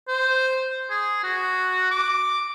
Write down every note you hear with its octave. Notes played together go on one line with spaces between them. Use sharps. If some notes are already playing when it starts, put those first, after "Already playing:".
C5
G#4
F#4
D6